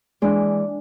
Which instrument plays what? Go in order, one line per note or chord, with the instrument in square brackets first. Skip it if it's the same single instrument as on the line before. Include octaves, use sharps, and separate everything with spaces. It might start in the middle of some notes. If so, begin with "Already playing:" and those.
[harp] E3 G#3 D4